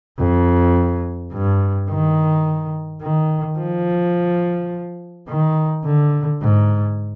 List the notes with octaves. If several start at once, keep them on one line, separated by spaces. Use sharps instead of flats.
F2
G2
D#3
D#3
F3
D#3
D3
G#2